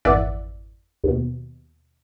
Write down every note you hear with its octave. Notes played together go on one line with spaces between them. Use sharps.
G#1 F2 E3 D5 E5 F#5
D#2 B2